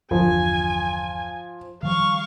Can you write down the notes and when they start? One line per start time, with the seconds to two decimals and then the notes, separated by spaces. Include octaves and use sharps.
0.11 G1 E2 D3 F3 G#5
1.83 D#3 F3 G3 F5 C#6